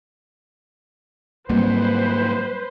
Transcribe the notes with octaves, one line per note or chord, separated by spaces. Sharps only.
G#2 F#3 G3 A#3 C4 B4 C5